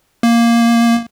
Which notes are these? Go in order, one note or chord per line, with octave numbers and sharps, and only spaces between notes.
A#3